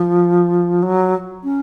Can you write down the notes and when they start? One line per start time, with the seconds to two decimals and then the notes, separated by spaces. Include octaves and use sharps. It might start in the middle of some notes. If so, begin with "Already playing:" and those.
Already playing: F3
0.82 F#3
1.44 C#4